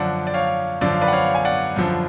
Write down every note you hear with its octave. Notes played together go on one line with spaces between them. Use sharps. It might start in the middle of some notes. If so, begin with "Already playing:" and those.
Already playing: F#2 D3 F3 D5 F#5
D5
C#5 F5
F#2 D3 F3 D5
F5
B4 D5
F#5
C#5 F5
G#5
D5 F#5
F#2 D3 F3